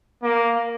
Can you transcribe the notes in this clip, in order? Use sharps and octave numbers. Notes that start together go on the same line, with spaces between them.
A#3